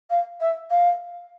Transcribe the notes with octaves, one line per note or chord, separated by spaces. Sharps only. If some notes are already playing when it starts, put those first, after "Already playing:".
F5
E5
F5